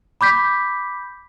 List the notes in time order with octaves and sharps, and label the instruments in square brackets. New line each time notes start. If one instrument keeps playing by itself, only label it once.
[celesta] B5 D6 G6 B6